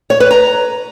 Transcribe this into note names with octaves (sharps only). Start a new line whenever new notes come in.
C#5
B4
A#5